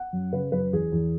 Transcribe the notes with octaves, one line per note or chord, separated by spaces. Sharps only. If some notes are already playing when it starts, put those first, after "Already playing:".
Already playing: F#5
F#2
C#3 B4
F#2 B4
E2 G#4
E2